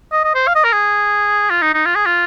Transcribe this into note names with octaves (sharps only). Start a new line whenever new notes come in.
D#5
D#5
C5
F5
D#5
A#4
G#4
F4
D#4
D#4
F4
G#4
F4